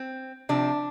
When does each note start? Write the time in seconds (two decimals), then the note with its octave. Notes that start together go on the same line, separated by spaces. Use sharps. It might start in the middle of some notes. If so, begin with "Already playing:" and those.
Already playing: C4
0.49 C3 F3 D4